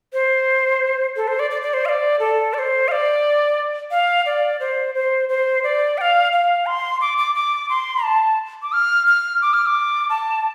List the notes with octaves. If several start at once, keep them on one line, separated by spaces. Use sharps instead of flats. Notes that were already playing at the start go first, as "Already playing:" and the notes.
C5
A4
C5
D5
D5
D5
C5
F5
D5
A4
D5
C5
F5
D5
F5
D5
C5
C5
C5
D5
G5
F5
F5
C6
D6
D6
D6
C6
A5
D6
F6
F6
D6
F6
D6
A5